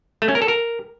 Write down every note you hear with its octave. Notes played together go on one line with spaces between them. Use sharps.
A3
C#4
A#4
A4
A#4